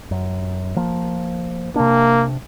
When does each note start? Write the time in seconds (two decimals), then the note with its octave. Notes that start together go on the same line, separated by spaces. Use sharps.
0.11 F#2
0.76 F3 A#3
1.76 C3 A#3 D4